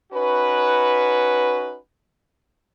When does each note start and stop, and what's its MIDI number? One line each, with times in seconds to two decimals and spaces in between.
0.13 1.77 61
0.13 1.77 63
0.13 1.77 66
0.13 1.77 71